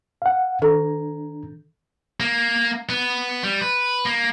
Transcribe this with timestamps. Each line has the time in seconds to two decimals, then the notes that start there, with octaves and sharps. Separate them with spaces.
0.22 F5 F#5
0.62 D#3 D4 A4 A#5
2.20 A#3
2.89 B3
3.44 G3
3.61 B4
4.05 A#3